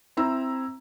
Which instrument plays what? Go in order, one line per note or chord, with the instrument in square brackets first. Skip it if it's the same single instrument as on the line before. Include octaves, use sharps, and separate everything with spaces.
[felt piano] C4 E4 A#5 E6